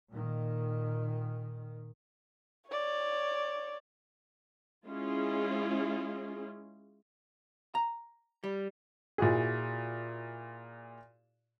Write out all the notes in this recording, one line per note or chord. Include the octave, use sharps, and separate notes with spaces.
A#2 D#3
C#5 D5
G#3 C#4 E4 F4 G#4
A#5
G3
A#2 E4 F#4 G#4